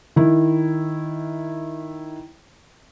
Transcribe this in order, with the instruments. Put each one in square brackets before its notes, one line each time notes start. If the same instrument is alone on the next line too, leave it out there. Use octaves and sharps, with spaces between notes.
[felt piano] D#3 E4